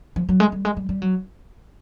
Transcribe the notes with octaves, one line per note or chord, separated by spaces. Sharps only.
F3
F#3
G#3
G3
G#3
G3
G3
F#3